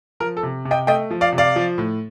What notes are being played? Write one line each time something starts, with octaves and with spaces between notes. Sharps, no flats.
F3 A#4
A4
C3
C3
D#5 G5
A3 D#5 G5
F3
D5 F5
C3
D5 F5
F3
A2